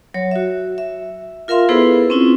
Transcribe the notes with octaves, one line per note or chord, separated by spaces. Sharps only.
F#3 C#5
F#4 E5
E5
F4 A#4 E5 F5 C6
B3 E4 G#4 A4 B4 C5
C4 C#4 E4 F4